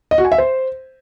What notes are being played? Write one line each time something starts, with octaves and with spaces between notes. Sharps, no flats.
D#5
F#4
G#5
E5
C5